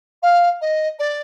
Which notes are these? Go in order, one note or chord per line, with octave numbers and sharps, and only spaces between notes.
F5
D#5
D5